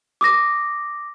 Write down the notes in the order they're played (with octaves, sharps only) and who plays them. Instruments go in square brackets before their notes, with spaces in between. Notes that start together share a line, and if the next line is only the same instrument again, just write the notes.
[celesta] D6 D#6 A#6